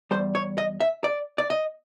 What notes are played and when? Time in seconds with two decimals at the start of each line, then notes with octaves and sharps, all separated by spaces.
0.11 E2 B2 G3 C5
0.35 C#5
0.58 D#5
0.80 E5
1.04 D5
1.38 D5
1.50 D#5